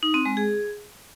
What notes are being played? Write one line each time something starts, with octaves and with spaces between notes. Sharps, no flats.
D#4
C4
G#3
G#4